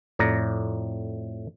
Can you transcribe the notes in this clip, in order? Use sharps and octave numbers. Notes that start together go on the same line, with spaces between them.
F2 A2 D5 A#5